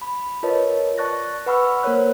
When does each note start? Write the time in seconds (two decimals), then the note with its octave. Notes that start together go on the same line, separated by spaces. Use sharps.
0.02 B5
0.43 F4 A#4 B4 C#5 D#5 A5
0.98 D5 A5 C#6 F#6 A6 A#6
1.46 B4 F#5 B5 C#6 E6 F6
1.83 A#3 A#4 C5 C#5 F#6